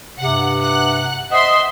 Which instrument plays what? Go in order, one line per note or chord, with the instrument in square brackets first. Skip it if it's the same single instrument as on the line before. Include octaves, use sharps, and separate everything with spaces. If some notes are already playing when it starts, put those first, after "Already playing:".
[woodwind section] G2 C3 [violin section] F#5
[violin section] F#5 F#6
[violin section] C5 E5 C6 [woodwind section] D#5 F#5